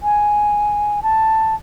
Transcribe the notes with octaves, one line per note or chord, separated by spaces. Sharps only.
G#5
A5